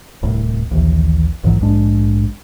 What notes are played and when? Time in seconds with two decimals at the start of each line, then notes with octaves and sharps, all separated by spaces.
0.22 D1 C2 A2
0.71 A#1 D#2 E3
1.44 A#1 G#2 E3 F#3
1.61 A#1 G#2 G#3 D4